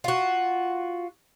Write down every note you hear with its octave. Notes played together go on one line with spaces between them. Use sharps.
F4 F#4